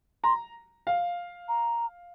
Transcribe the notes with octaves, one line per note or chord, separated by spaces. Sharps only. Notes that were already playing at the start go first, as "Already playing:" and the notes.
A#5 C6
F5
A#5